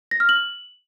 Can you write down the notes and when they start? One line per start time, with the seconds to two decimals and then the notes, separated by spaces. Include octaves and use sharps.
0.11 A#6
0.20 F6
0.29 F#7